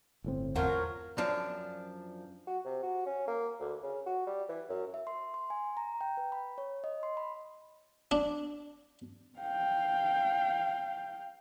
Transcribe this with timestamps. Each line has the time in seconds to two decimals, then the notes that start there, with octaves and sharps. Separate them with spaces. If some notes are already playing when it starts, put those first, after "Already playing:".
0.24 G1 A2 C4
0.56 E2 F3 F#3 A#4
1.18 F#2 F3 D4
2.47 F#4
2.65 C3
2.83 F#4
3.06 C#4
3.28 A#3
3.60 D2
3.83 C#3
4.06 F#4
4.27 G3
4.49 E3
4.69 F#2
4.94 E5
5.07 C6
5.34 C6
5.50 G#5
5.77 A#5
6.01 G5
6.17 B4
6.32 B5
6.58 C#5
6.84 D#5
7.03 C6
7.17 B5
8.11 D4
9.39 F5 G5